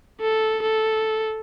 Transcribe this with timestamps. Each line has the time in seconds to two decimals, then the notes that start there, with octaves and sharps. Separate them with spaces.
0.21 A4
0.63 A4